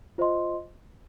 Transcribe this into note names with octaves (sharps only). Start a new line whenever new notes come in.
F4 C5 D#5 C6